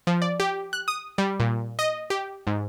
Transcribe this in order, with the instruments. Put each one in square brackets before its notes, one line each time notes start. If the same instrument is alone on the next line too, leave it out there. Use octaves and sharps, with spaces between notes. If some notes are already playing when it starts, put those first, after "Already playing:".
[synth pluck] F3
D5
G4
F#6
D#6
G3
A#2
D#5
G4
G#2